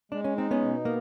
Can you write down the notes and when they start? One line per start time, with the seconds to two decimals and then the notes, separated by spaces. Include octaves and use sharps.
0.12 G#3 D4
0.24 C#4
0.36 C4 D#4
0.51 B3 C#4
0.61 B2
0.85 A#3 B3